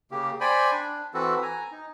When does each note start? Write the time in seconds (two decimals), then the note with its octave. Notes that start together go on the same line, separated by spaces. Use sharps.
0.11 C#3 A#3 G4
0.41 C5 D5 G5 G#5 B5
0.72 D4
1.14 E3 C4 F#4 A4 B4
1.42 G#5 A#5
1.71 D#4